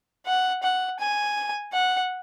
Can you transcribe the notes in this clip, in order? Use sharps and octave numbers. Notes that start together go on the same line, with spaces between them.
F#5
F#5
G#5
F#5